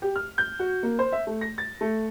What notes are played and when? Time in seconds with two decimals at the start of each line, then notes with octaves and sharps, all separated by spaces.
0.02 G4
0.16 F6
0.38 G6
0.59 F#4
0.83 A#3
0.99 C5
1.13 E5
1.27 A3
1.41 A#6
1.58 A6
1.81 A3